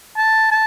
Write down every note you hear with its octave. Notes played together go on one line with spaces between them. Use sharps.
A5
A5